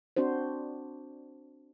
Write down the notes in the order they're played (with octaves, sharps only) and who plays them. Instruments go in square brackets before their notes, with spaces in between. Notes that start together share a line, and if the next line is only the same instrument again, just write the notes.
[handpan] C4 D4 F#4 C5